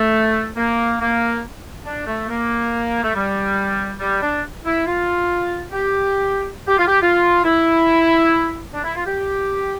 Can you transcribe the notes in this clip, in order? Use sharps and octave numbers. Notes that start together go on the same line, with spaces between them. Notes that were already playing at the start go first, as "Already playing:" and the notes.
Already playing: A3
A#3
A#3
D4
A3
A#3
A3
G3
G3
D4
E4
F4
G4
G4
F4
G4
F4
E4
D4
E4
F4
G4